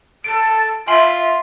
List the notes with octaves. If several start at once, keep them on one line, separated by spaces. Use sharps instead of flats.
A4 D7
F4 E5 G#5 C6 C7